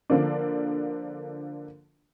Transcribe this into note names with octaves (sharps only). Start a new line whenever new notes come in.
D3 F3 A#3 D4